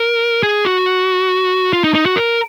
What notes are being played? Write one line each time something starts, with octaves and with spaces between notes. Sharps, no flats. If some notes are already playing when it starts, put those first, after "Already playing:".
Already playing: A#4
G#4
F#4
F4
D#4
D#4
F#4
A#4